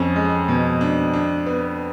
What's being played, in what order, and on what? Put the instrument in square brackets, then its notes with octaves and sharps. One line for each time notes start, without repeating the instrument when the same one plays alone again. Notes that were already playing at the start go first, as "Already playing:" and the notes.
Already playing: [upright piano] F2 [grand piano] C#4
[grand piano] G#3
B2
D4
D4
B3